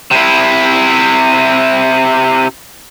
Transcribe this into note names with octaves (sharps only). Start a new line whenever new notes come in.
C3 E4